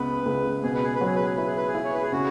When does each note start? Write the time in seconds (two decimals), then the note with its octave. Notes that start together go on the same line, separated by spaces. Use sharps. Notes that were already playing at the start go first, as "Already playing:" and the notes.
Already playing: C#2 B3 B4
0.26 C#2
0.63 B2 G#4
0.74 B4
0.84 G#4
0.95 B4
1.01 F#3 G#4
1.16 B4
1.26 G#4
1.36 E4 B4
1.46 G#4
1.57 B4
1.67 G#4
1.75 E4
1.85 C#5
1.93 B4
2.03 G#4
2.12 C#3 F#4